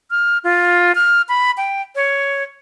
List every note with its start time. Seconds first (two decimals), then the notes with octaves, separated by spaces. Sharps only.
0.11 F6
0.44 F4
0.95 F6
1.29 B5
1.58 G5
1.95 C#5